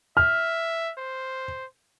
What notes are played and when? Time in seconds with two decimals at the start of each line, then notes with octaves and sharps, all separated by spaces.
0.17 E5 F6
0.98 C5